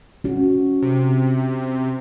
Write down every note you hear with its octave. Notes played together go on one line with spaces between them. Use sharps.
C#4 F#4
C3